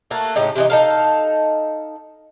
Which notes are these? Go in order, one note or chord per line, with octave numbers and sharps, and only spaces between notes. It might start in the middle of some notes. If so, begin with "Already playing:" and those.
A3 A#3 F#4 A4
A2 C#3 D#4 G4
C3 E3 D#4
D#4 A4 F5